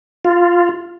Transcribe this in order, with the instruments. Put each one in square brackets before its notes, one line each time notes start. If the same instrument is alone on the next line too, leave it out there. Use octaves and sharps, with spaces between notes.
[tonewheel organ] F4